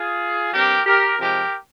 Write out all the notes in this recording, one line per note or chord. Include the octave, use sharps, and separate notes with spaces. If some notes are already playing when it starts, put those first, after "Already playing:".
Already playing: F4 G#4
G2 G3 C4 G4 A#4
G4 A#4
C3 F3 G#3 G4 A#4